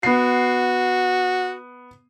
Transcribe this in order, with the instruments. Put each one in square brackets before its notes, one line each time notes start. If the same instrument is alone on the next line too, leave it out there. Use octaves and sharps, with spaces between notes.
[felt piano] B3 C7 [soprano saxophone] F#4